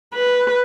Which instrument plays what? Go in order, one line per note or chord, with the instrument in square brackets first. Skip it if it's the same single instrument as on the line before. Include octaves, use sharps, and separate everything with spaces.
[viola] B4